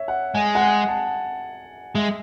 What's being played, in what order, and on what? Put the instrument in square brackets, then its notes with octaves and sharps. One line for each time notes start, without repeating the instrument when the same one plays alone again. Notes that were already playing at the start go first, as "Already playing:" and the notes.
Already playing: [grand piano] C#5 E5
F#5
[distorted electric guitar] G#3 [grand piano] G#5
[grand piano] F#5
G#5
A5
[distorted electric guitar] G#3 [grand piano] E5